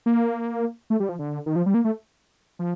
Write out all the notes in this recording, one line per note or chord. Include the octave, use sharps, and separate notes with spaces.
A#3
A3
G3
F3
D3
D#3
F3
G3
A#3
A3
F3